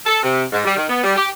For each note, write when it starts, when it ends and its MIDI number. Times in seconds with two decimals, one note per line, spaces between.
0.05 0.22 69
0.23 0.42 48
0.52 0.62 44
0.65 0.75 55
0.76 0.86 51
0.89 1.01 59
1.04 1.16 55
1.16 1.28 67